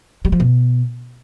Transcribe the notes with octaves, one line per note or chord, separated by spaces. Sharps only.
G3
F3
B2